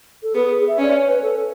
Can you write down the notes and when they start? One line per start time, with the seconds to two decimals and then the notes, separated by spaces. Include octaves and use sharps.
0.23 A4
0.34 B3 G#4
0.68 E5
0.78 C#4 D5
0.96 C#5
1.09 B4
1.22 A4